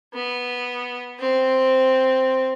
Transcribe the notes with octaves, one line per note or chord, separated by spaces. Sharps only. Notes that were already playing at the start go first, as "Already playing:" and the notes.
B3
C4